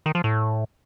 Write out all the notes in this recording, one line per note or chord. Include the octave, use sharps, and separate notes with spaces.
D#3
F3
A2